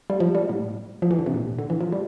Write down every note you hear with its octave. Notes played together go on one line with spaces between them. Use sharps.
G3
F3
G3
A2
F3
E3
D3
C3
A#2
D3
E3
F3
G3